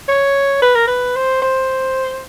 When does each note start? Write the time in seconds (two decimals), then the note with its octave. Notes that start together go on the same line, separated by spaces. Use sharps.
0.08 C#5
0.62 B4
0.75 A#4
0.87 B4
1.16 C5
1.42 C5